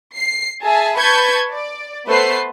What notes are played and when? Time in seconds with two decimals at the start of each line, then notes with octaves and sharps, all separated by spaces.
0.16 C7
0.65 G#4 E5 G#5 A5
0.98 B4 A5 B5 C#6 G6 G#6
1.52 D5
2.08 A3 B3 B4 C5 C7